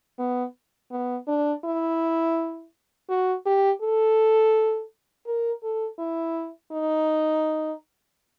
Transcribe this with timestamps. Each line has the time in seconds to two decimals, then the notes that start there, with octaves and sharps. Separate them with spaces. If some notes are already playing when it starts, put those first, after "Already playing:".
0.19 B3
0.91 B3
1.28 D4
1.65 E4
3.09 F#4
3.46 G4
3.82 A4
5.26 A#4
5.63 A4
5.99 E4
6.72 D#4